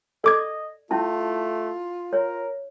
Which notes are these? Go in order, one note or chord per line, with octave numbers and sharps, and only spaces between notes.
A4 D5 D#5 D6 G#6
A3 C#4 E4 F4 A5
A#4 C#5